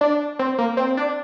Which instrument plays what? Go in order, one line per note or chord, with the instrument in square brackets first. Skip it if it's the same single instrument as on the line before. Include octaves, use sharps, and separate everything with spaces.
[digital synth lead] D4
C4
A#3
C4
D4